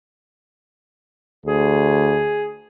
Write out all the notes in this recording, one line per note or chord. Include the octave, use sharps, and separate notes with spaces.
D2 G#4